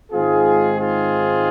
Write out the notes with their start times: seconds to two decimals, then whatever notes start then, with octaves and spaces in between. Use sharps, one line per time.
0.12 G#2 D#3 G#3 C4 F4 G#4
0.80 F4 G#4